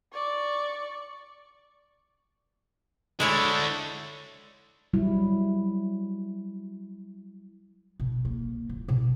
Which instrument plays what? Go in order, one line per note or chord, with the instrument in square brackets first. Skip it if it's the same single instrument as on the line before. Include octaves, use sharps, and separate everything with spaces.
[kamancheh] D5 C#6
[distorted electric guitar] D3 A3 [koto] G#3 E4 C#5
[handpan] F#3 G3 E4
[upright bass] B2
A#3
D#1
B2